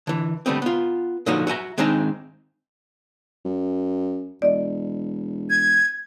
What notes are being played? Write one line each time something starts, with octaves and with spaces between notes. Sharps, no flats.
D3 E3
D3 G3 A3 B3 C4
B3 F4
A#2 D3 F3 F#3 D#4 F#4
F#4 E5 G#5 A#5
D#3 G#3 C4 D4 D#4 A#5
F#2
E1 D5 D#5
G#6